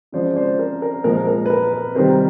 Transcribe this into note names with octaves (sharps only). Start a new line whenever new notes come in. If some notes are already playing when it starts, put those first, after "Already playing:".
C#3 F3 G#3 C5 D5
C5 D5
A#4
A#4
A#2 F3 G#3 A#4
A#4
B4
A#4
B4
C3 D#3 G3 A#4 C5